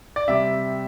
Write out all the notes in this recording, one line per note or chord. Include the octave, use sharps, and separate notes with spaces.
D5
C3 G3 E5